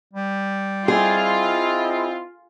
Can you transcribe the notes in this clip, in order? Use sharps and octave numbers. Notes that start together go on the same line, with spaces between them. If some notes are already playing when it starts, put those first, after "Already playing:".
G3
C4 E4 F4 G#4 D#5